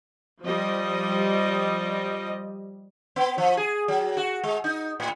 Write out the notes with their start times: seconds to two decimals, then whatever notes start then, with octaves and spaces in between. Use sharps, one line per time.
0.44 F3 G3 D#5
3.16 B3
3.38 F3
3.57 G#4
3.88 F#3
4.17 F#4
4.44 G#3
4.64 D#4
5.00 A2